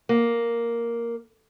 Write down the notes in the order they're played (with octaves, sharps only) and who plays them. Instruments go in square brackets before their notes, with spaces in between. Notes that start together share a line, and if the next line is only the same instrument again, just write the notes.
[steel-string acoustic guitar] A#3